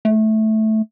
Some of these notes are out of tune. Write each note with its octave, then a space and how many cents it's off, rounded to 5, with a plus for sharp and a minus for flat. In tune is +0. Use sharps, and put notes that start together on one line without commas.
A3 -10